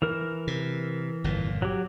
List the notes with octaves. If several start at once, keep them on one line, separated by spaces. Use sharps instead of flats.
E3 A#4
C3
G1 F2 A#2
F#3 G4